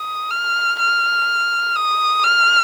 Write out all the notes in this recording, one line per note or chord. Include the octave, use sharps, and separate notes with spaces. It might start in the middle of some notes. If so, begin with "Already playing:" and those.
Already playing: D#6
F6
F6
D#6
F6